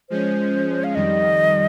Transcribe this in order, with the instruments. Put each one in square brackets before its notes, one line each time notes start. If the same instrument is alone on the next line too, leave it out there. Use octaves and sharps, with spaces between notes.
[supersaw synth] F3 G#3 C#4 [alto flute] C5
[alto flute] F5
[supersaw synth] F2 D#3 G3 [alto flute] D#5